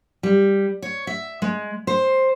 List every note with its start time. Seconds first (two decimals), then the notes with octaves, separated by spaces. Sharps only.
0.23 G3
0.82 C#5
1.07 E5
1.42 G#3
1.87 C5